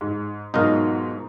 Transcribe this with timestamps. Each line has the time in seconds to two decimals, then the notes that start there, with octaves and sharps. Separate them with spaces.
0.01 G#2
0.54 G#2 B2 F#3 D#4 F4 A#4